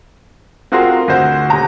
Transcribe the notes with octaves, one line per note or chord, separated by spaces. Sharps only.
C4 F4 F#4 G#4 A#4 C6
D2 F#4 C5
D#1 A#5